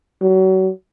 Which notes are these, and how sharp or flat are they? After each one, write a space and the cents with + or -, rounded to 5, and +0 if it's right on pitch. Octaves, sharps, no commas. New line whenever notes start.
F#3 +30